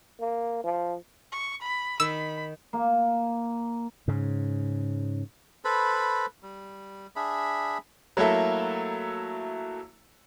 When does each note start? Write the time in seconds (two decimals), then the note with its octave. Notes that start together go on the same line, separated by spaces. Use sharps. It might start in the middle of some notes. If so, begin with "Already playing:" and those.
0.20 A#3
0.64 F3
1.32 C#6
1.62 B5
2.00 D#3 B5 E6
2.73 A#3
4.08 G#2 C#3
5.65 A4 B4 C5 B5
6.43 G3
7.16 D4 G#4 E5 B5
8.17 F#3 A3 A#3 E4 A4 E5